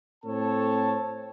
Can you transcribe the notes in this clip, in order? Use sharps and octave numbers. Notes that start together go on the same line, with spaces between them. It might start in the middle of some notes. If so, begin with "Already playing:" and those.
A2 C4 A4 C#5 A5